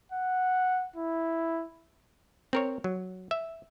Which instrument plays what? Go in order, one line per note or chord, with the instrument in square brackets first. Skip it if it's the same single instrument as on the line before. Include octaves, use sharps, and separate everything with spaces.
[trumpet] F#5
E4
[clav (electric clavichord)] C4 A#4 C#5
F#3
E5